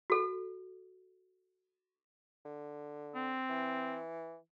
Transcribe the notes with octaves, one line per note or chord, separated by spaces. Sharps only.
F#4 A4
D3
C4
E3